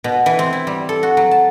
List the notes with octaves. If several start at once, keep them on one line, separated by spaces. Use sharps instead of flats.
B2
E3
C4
E4
G3
A4
F#4
F#3
A5